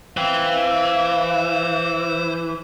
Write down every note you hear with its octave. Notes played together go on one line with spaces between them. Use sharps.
E3 C5 F5 G5